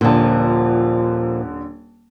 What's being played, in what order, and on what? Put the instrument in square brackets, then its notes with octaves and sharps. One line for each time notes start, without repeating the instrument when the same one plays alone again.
[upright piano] D#1 D3 [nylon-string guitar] A#2 F3